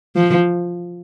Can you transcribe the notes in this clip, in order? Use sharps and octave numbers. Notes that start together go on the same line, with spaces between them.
F3